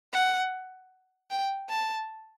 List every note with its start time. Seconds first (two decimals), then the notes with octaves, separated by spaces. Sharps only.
0.13 F#5
1.30 G5
1.69 A5